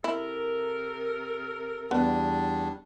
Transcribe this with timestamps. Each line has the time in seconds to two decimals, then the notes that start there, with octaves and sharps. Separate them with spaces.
0.04 C3 E4 A4 A#4
1.91 E2 G3 B3 D4